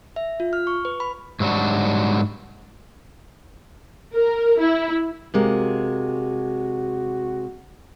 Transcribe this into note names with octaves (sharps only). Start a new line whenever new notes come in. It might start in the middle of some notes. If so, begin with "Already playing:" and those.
E5
F4
F6
C#6
B4
B5
G#2 F#3 G3 D4 F#4
A#4
E4
C3 G#3 A#3 F#4